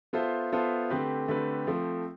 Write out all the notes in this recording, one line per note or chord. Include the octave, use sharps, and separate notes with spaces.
B3 F4 A4 C5 E5
B3 F4 A4 C5 E5
D3 A3 C4 G4 B4
D3 A3 C4 G4 B4
F3 A3 C4